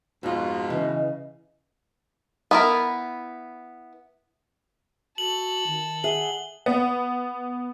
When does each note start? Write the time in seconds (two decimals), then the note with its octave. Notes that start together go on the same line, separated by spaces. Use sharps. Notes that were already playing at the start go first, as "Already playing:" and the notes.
0.23 F2 G#2 B2 F4
0.70 C#3 E3 D#5
2.51 B3 E4 A#4
5.18 F#4 A4 F#7
5.67 D#3
6.04 G#4 E5 F#5 F#7 G7
6.66 B3